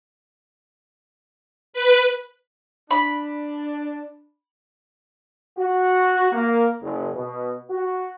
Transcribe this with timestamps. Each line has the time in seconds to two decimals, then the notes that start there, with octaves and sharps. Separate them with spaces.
1.73 B4
2.91 D4 B5
5.58 F#4
6.32 A#3
6.81 F#1
7.14 B2
7.70 F#4